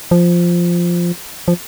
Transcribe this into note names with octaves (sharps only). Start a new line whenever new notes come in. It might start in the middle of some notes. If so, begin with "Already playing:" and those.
F3
F3